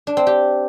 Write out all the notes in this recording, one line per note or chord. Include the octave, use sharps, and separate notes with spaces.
D4
C4
G4